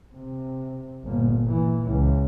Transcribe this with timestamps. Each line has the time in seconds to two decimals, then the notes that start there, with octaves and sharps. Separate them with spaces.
0.14 C3
1.05 G1 A#2
1.46 A#2 E3
1.88 C#2